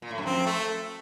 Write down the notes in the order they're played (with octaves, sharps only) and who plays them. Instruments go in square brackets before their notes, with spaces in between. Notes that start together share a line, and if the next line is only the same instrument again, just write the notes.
[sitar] A#2
A2
F#2
[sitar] F2 [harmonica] C4
[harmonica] A3